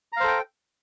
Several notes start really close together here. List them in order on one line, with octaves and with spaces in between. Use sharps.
A#5 F5 C5 A4 G5